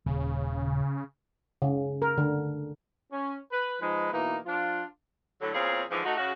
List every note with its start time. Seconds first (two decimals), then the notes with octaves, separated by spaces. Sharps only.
0.06 D#1 C#3
1.62 C#3
2.02 A#4
2.18 D3
3.12 C#4
3.51 B4
3.82 F3 G#3 D#4 B4
4.12 B2 E3 A#3 D#4
4.46 F3 D4 F4
5.41 A2 D3 F#3
5.53 E2 A#2 C4 G#4 C#5 F5
5.90 G#2 D3 E3 F3
6.05 A3 D#4 F#4
6.16 C#3 F#4